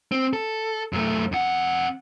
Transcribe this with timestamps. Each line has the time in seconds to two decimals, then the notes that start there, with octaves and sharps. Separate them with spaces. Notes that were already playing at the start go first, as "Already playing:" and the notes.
0.12 C4
0.33 A4
0.93 F#2 A3
1.32 F2 F#5